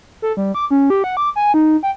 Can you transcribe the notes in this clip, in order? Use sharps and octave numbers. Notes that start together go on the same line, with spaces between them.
A4
G3
D6
C#4
G4
F#5
D6
G#5
D#4
G5